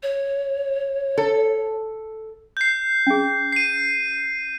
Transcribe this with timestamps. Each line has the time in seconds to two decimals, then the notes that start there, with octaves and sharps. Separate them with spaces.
0.03 C#5
1.18 A4
2.57 G6 C7
3.07 C#4 G#4
3.52 C7 D#7